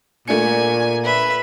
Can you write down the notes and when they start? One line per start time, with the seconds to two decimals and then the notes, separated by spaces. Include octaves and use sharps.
0.28 A#2 A3 D4 G#5 C#7
1.04 B4 E5